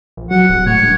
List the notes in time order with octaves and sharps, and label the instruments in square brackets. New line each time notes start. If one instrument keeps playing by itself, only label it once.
[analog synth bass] A#1
[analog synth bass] F#3 [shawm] F#5
[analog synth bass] D1
[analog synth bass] A2 [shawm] C#5
[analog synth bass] G2